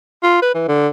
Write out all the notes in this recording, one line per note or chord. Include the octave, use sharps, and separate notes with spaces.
F4
B4
E3
D3